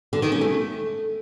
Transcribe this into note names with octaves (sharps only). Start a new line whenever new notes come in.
D3
D#3
C#4
A3